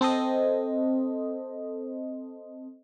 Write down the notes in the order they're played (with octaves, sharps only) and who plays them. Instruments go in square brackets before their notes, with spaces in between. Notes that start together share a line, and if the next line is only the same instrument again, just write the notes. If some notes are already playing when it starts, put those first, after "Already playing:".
[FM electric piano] C4 A4 C5 D#5